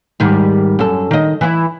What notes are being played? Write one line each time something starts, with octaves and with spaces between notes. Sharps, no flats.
G#2 D#3 G3
F#2 A4
D#3 D#5
E3 E4